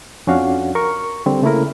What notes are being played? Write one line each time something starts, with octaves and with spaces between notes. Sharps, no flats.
F2 C#4 D4 F#4 F5 F#5
A#4 C#6
D3 G3 C4
C#3 A3 A#3 E4 A#4